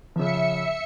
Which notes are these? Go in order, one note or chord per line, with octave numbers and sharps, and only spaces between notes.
C#3 F3 E5 C#7